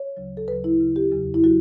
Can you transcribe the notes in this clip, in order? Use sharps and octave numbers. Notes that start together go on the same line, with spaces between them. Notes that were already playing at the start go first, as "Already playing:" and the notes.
Already playing: C#5
D2 C#3 F#3
A4
D2 C#3 F#3 B4
E4
D2 C#3 F#3
G4
E2 C#3 F#3
E4
F#3 F#4